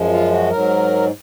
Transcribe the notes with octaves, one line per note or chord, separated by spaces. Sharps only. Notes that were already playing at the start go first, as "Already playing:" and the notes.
Already playing: F#2 F3 G#3
F4
F#4
G#2 F#3 A#4